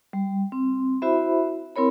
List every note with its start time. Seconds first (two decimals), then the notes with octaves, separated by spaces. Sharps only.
0.13 G3
0.52 C4
1.02 E4 F#4 C5 E5 B5
1.76 C4 E4 A#4 C#5 B5